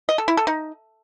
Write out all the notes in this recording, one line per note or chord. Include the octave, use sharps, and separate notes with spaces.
D#5
A4
E4
A4
D#4